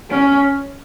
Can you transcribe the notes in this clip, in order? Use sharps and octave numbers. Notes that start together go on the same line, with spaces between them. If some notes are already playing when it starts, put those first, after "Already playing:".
C#4